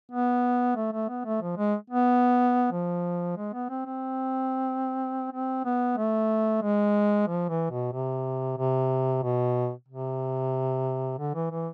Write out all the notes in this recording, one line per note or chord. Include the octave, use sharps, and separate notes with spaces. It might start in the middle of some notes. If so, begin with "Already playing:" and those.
B3
A3
A3
B3
A3
F3
G#3
B3
F3
G#3
B3
C4
C4
C4
B3
A3
G#3
F3
E3
B2
C3
C3
B2
C3
D3
E3
E3